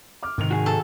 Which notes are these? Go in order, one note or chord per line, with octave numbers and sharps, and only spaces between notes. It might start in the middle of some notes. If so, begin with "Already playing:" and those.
D6 F6
G#2 C3 D#3 F7
F#4 G#4
A4